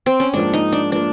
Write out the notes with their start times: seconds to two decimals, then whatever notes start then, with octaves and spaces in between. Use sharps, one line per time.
0.06 C4
0.20 C#4
0.34 G#2 F3 A#3 D4
0.53 D#4
0.72 D4
0.92 F3 A#3 D4